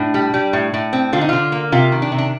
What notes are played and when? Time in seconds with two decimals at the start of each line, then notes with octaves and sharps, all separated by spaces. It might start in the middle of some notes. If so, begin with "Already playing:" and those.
Already playing: A2 D4
0.14 G3
0.34 G3
0.53 A2
0.74 A2
0.93 C4
1.13 D3 F4
1.21 D#4
1.29 D3 F4
1.52 A#3
1.72 C3 F4
1.92 D#3
2.02 D4
2.12 C3
2.18 D4